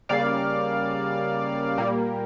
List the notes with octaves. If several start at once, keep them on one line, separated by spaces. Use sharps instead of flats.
C#3 G3 A#3 D5 F5
A#2 G3 A#3